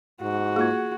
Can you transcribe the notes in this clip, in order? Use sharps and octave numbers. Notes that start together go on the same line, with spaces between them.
G#2 F#4
A#3 F4 G#4 G#6